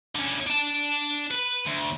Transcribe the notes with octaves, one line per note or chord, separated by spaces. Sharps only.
D3 C#4
D4 A5
B4
D2